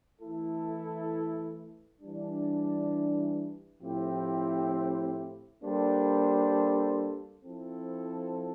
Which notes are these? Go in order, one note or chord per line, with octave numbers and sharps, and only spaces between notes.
E3 A3 E4 A4
E3 G3 D4
A2 F3 C4 E4 G4
G3 A#3 D4 A4 C5
F3 C4 E4 A4